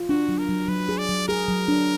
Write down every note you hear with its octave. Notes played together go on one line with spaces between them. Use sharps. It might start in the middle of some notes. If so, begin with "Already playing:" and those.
Already playing: F4
D4 F#4
F#3
A#4
F#3
F#3 B4
G#4
D5
F#3
G#4 A#4
F#3
D4